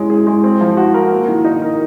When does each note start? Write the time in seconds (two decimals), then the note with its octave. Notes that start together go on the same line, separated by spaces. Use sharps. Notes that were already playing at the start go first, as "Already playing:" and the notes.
Already playing: G#3 C#4
0.10 G#4
0.27 G#3
0.44 C4
0.61 F3
0.77 F#4
0.94 A#4
1.11 A#3
1.28 D#3
1.44 D#4
1.62 A#4